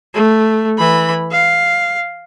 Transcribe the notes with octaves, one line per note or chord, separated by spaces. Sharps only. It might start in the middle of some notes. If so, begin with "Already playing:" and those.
A3
E3 B5
F5